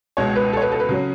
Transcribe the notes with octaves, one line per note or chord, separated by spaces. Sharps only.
C#2 B2 G#3 C#5
B4
A4
C#5
B4
A4
B4
C#3 F#3 C#4